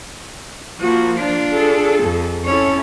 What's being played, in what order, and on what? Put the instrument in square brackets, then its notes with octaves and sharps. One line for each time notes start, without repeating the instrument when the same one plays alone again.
[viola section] F3 A#3 [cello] F#4
[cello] D4 F4
[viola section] G#4 A4
[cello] F2
[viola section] C#4 E4 A4 [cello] C#5